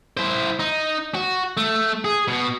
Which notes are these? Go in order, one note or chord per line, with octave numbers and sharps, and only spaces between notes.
E4 C5
D#4
F#4
A3
G#4
B2